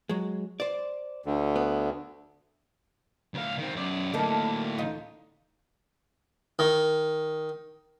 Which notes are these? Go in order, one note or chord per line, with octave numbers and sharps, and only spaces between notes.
F#3 G#3
C5 D5
D2 D3
B3
D2 F5
D#3 C4
F#2 D5
D2 A2 A#3 D#4 A4
D#4 F4
D#3